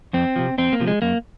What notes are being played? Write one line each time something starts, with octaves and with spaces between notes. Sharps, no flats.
F2 C4
C3 F3
F2 C4
A#3
C3 F3
G#3
F#2 A#3